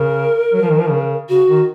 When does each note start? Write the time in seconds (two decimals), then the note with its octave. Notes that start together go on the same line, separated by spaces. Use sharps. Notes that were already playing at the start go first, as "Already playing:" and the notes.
Already playing: C#3 A#4
0.53 F#3
0.62 F3
0.71 D#3
0.79 F3
0.91 C#3
1.29 C#3 F#4
1.48 D#3